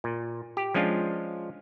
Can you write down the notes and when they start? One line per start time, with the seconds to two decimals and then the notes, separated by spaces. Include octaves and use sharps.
0.04 A#2
0.57 G4
0.74 F3 G#3 C#4 D4 F4